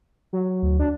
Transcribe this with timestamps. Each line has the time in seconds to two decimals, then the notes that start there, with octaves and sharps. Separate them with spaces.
0.33 F#3
0.62 D2
0.79 D4